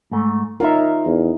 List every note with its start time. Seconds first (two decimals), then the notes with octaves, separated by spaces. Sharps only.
0.11 G#2 A3
0.60 D#4 F4 A#4 C#5 E5
1.06 E2